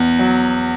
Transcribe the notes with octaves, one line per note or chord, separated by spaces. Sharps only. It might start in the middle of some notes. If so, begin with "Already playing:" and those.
Already playing: E2
F#3